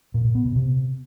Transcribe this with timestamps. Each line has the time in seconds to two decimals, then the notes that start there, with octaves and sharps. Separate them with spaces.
0.14 A#2
0.25 A#2
0.35 B3
0.45 B2
0.56 C3